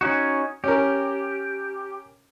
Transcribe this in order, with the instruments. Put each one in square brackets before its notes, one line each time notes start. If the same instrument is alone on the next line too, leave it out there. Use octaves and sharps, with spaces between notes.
[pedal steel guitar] C#4 D#4 F#4
[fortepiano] C#4 A#4 [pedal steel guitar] G4